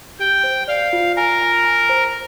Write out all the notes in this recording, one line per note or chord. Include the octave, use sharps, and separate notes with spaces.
G4 G5
C5
D5 F5
F4
A#4 G#5
G#5
A#5
C5